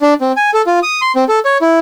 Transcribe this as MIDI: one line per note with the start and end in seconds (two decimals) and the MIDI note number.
0.01 0.14 62
0.21 0.32 60
0.37 0.50 80
0.54 0.62 69
0.67 0.79 65
0.83 1.01 87
1.02 1.12 84
1.16 1.24 60
1.29 1.39 69
1.45 1.57 73
1.62 1.79 64